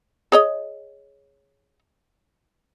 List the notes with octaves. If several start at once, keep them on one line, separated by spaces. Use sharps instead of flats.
G#4 C#5 D#5